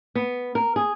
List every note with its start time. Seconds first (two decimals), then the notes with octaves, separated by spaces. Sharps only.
0.15 B3
0.55 A#4
0.76 G#4